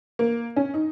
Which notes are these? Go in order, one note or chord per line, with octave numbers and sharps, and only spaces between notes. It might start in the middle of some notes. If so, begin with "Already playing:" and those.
A#3
C#4
D#4